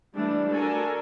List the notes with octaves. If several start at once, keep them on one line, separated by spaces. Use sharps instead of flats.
E3 G3 A3 D4
D4 F#4 A4 A#4 G#5